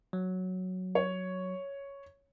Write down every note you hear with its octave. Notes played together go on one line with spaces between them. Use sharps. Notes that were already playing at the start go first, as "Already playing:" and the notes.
F#3
C#5